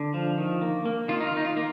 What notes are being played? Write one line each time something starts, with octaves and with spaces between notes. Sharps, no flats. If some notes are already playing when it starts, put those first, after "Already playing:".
Already playing: D3
F3
D#3
A#3
A#3
D#3 F4
D#4
F4
D#3 D#4
F4
A#3